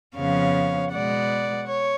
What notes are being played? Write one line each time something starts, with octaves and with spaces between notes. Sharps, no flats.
F2 C#3 F3 B3 C#5 F5
B2 G#3 B3 D5 F#5
C#5